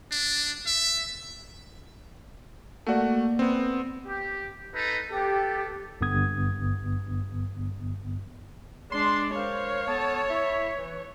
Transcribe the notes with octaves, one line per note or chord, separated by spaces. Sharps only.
D4
E5
A3 A#3 F#4 D5
B3 C4
G4
D#4 A4 B4
B3 G4 A4
G#1 G2 D3 B3 D#6 G#6
G#3 D4 C6
A#4 C5 C#5 F5
B3 A4 A5
E4 E5
E3